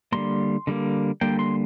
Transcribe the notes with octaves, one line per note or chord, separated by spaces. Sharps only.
D3 G3 A#3 C6
D3 G3 A#3
D3 G3 A#3 G5
C6